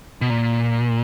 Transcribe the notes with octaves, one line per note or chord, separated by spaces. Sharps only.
B2
A#2